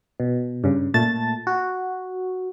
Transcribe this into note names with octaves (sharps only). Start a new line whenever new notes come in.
B2
G2 C#3
A#2 A3 A5 A6
F#4